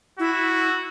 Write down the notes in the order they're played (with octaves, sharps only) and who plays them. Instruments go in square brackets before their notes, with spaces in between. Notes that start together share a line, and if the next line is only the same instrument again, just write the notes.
[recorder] E4 [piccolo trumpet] F#4